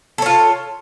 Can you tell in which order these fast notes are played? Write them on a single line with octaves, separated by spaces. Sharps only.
A4 C#5 F4